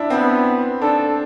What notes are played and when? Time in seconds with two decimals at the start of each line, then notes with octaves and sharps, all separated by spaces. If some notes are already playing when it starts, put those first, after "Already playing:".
Already playing: D4 E4
0.10 B3 C4
0.81 D4 A4